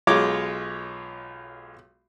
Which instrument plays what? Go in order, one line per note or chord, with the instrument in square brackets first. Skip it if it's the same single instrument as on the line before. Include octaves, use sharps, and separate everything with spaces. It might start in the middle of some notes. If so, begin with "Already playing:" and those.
[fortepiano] B1 G#3 F4 C#5 D6